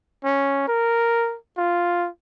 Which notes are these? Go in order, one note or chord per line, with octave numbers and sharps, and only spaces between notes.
C#4
A#4
F4